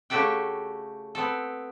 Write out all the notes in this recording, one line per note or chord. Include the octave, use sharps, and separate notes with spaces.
C#3 A3 F#4 G4 A4 G5
B3 C4 A4